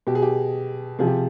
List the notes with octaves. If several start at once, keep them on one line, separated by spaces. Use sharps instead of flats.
B2 G4
G#4
G4
C3 F3 G#4
G4